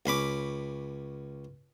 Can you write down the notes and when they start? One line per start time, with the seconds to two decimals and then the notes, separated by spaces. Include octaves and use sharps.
0.06 C#2 C#4 B5 D6